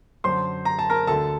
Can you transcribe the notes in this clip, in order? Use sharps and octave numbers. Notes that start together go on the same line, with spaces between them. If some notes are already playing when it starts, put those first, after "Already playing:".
F#2 D3 C5 C6
A#5
A5
A#4 A#5
D2 D3 A4 A5